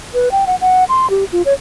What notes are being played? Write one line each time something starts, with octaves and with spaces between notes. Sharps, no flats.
B4
G5
F#5
F#5
C6
G4
F4
C#5